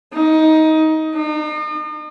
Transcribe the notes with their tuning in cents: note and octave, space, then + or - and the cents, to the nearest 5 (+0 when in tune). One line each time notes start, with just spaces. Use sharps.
D#4 +20
D#4 -40